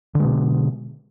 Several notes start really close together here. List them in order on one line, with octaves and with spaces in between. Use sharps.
D3 G#3 B2